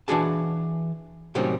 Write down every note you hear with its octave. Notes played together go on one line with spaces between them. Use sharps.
E3 F3 D4 F#4 G#4 A5
A2 C3 D#3 F#3 G3 C#4